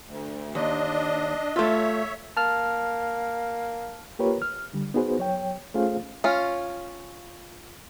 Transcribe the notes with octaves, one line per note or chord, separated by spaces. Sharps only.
D2
D#2 D4 D#5
A3 F4 C#5 E5
A#3 A5 F6
A#3 F4 G4 A#4 B4 C#5
F6
D3 G3
B3 D#4 F#4 G#4 B4 C5
F#3 C#5 G5
A3 C#4 F4 G#4 C5 F5
C#4 F4